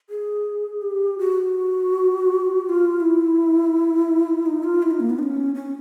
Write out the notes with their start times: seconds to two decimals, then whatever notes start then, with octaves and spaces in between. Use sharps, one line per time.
0.10 G#4
0.82 G4
1.19 F#4
2.64 F#4
2.69 F4
3.00 E4
4.46 D#4
4.63 F4
4.83 E4
4.91 D#4
5.00 A#3
5.10 B3
5.19 D#4
5.23 C#4
5.55 C#4